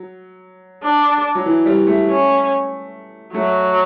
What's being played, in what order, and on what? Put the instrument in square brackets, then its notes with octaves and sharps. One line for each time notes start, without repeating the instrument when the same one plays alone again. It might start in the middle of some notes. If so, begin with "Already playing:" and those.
Already playing: [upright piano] F#3
[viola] D4
[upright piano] F#3
E3
G3
A3
[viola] C#4
[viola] F#3 [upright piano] A3